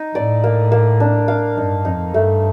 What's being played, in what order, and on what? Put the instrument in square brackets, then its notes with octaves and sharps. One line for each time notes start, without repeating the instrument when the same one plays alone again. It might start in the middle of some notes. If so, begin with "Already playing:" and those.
Already playing: [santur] D#4
[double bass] A2 [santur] D5
[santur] A#3
A#3
D4
F5
[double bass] G2 [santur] D#4
[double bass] F2 [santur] D#4
[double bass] G2 [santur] A3